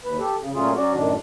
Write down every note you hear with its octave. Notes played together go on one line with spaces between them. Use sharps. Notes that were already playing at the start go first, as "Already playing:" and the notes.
D#2 B4
G4 A4
C#3
A#2 F#3 A3 C#4 F4 G#4
F#3 C#4 F#4 D5
F#2 A2 D#3 D4